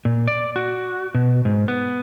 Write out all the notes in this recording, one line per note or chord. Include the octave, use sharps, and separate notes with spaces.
A#2
D5
F#4
B2
G#2
B3